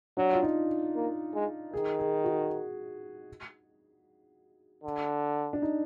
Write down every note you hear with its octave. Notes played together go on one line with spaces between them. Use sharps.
F#3 D4
F4
D#4
A#3
G#3
D#3 G#4
G#4
F#4
D3
D4
D#4